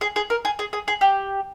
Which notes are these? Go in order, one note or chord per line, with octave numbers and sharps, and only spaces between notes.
G#4
G#4
A#4
G#4
G#4
G#4
G#4
G4